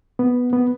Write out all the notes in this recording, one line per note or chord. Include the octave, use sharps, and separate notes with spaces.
B3
B3